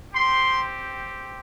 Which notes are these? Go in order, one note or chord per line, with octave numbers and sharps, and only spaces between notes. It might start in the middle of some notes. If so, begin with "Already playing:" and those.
C4 G4 C6